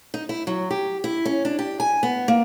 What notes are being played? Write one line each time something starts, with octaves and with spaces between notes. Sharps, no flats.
D#4
E4
F#3
G4
E4
C#4
D4
G4
G#5
B3
A#3